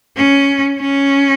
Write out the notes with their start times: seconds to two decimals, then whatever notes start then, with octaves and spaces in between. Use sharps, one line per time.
0.17 C#4
0.80 C#4